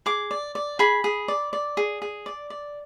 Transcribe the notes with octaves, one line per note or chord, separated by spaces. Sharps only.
G#4 D6
D5
D5
G#4 B5
G#4
D5
D5
G#4
G#4
D5
D5